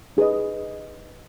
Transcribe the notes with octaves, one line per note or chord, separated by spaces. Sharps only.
D#4 G#4 B4 D#5